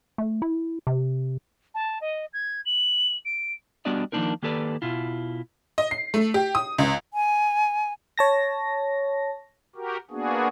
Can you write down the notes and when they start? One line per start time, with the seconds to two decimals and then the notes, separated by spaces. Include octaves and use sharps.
0.18 A3
0.42 E4
0.87 C3
1.74 A5
2.01 D#5
2.33 G#6
2.65 F#7
3.25 D7
3.85 G3 B3 D4 F#4 D5 D#5
4.12 D#3 F3 A#3 D4 D#4 A#4
4.43 D#3 A#3 G4 A4 B4 D5
4.82 B2 E4 F4
5.78 D#5
5.91 C7
6.14 A3
6.34 G4
6.55 D#6
6.78 C#2
7.14 G#5
8.18 C#5 A5 A#6
9.76 F#4 G4 A#4
10.11 A#3 B3 D4 F#4 G#4